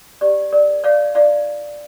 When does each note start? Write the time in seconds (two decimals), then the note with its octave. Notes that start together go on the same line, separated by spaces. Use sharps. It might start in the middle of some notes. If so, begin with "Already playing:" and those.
0.21 G4 D5
0.52 A#4 D5
0.84 C#5 D5 F5
1.15 E4 D5 F5